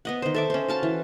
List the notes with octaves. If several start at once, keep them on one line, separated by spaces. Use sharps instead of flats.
B3 D#5 F#5
D#3 C5
A4 E5 D6
C#4 C5
F#4 F5 A5
E3